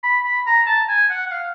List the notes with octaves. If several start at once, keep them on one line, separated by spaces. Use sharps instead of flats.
B5
B5
A#5
A5
G#5
F#5
F#5
F5